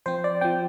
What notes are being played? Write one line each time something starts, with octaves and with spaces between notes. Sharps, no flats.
F3 C4 C5
D5
F3 C4 G5